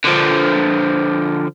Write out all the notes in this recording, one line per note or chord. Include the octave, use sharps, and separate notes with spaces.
D3 F3